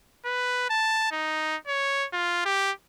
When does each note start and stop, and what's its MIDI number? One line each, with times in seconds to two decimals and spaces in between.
0.25 0.66 71
0.70 1.09 81
1.12 1.56 63
1.67 2.06 73
2.13 2.40 65
2.45 2.71 67